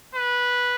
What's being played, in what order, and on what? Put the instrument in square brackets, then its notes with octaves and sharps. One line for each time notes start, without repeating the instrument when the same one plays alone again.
[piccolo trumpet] B4